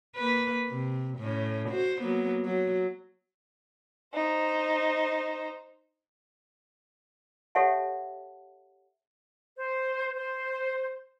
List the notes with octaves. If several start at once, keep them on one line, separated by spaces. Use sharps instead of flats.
A#3 B4
C3
A2 C#4
F#4 C5
F#3 A#3 B3
F#3
D#4 C5
G4 A4 C#5 E5 F#5 A5
C5
C5